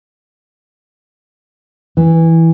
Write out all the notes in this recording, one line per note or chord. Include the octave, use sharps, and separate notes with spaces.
E3